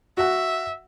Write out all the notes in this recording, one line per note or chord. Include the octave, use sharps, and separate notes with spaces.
F#4 E5 F#5